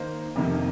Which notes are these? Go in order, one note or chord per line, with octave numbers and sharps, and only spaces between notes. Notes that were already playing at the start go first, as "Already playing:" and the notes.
Already playing: D#3 A#3 D#4 C5
F1 F2 C3 D#3 A#3